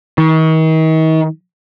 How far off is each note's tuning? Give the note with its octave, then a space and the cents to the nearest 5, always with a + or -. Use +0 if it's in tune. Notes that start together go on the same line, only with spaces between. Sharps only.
D#3 +40